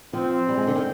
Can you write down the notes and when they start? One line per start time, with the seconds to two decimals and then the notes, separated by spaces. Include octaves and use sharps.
0.13 F3 C4
0.49 G3
0.57 G#3
0.67 D3
0.75 D#3